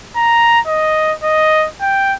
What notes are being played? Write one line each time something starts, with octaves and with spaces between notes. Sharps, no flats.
A#5
D#5
D#5
G5